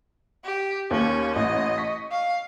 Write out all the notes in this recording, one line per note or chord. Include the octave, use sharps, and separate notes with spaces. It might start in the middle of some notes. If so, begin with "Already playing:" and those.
G4
D#2 A#3 C#4
A1 D#5
C#6 B6
F5